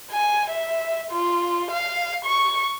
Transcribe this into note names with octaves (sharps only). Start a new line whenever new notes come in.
G#5
E5
F4
F5
C#6